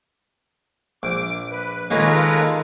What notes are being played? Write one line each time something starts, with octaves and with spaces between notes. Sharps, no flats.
A#1 D6
B4
D#3 G#3 A#3 C#4 F4 A4 B4 A#5